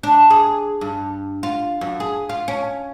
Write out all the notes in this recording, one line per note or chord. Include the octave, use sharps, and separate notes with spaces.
D4
G#4
G2
F4
F#2
G#4
F4
C#4